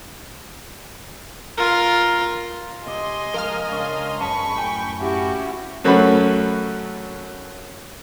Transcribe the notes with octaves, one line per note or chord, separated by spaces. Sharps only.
F4 A#4
C3 D#5 G#5 C6
F3 G#3 A#4 F5 F6
C#2 D4 C#5 C6
F#2 G#4 B4 D#5 A5 B5 C#6
A2 G5 G#5
C#4 E4 F#4 G4
F#2 F#3 A3 C#4 B5